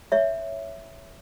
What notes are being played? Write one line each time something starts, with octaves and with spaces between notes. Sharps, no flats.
C#5 E5